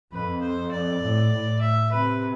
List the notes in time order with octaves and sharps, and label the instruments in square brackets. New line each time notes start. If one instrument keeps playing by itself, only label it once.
[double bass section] F2 [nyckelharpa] B4
[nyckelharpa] C5
D5
[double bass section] A2
A2
[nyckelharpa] E5
[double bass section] C3 [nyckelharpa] B4